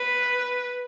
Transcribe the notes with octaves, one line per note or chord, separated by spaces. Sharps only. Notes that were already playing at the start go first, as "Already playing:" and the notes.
Already playing: B4